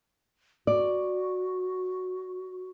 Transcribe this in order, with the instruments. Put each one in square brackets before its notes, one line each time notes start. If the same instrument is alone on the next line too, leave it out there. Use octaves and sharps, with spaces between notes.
[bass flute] F#4 [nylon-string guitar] D5